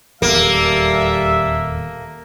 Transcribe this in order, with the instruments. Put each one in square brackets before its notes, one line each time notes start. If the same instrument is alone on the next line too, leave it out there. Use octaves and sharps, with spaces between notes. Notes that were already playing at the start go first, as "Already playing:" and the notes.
[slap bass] D#1 E2 B3 [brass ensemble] G3 A4 E5 [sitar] A#3